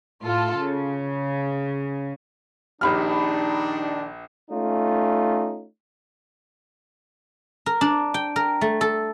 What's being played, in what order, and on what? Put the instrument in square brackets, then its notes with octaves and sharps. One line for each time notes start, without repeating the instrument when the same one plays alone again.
[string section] A2 F4 A4
C#3
[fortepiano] A#1 F6 [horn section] D#3 D4 [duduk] D#4 [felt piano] G4 B5
[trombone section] A3 C#4 D#4 F4
[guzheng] A#4
D4
G5
A#4
A3
A4